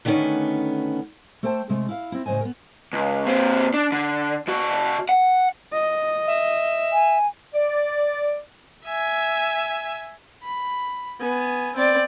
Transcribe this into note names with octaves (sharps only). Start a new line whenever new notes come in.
D3 D#3 A3 B3 C#4
A3 A4 C5 G5 A5
C3 G#3 A3
E4 F5
C4 E4
A2 C#3 F3 C5 D#5 G#5
B3 A#4
C#2
A#2 C4
D4
D3
C#3 F#4
F#5
D#5
E5
G#5
D5
E5 G#5
B5
B3 G#5
C4 D5